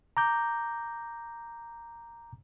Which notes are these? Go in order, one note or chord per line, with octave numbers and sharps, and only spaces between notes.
A#5 D6 G6